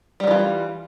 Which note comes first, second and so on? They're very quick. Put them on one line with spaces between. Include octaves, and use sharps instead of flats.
G3 F#3 E3 F4